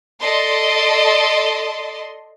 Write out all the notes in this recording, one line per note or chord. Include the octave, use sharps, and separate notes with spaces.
A4 D5 D#5 C6